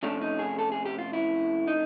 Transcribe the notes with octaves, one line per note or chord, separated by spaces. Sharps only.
C3 F3 A3 C#4 D4
D#4
G#4
A4
G#4
G4
F4
E4
D#4